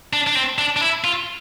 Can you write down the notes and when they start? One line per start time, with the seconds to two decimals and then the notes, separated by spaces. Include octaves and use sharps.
0.13 D4
0.27 D4
0.35 C4
0.58 D4
0.76 D4
0.81 E4
1.04 F4